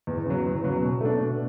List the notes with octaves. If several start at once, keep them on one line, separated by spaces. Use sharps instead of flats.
E2
C#3 F#3
E2
C#3 F#3
B2
A3 D4
B2